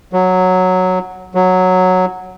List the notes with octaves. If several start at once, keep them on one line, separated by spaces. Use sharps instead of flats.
F#3
F#3